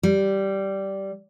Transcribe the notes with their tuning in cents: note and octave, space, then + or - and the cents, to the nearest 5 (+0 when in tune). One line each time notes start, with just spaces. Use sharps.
G3 -10